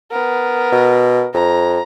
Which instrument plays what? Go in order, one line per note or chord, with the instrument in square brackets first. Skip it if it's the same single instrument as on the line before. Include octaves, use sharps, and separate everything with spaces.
[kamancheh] B3 A#4
[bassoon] B2
[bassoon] F2 [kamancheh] A#5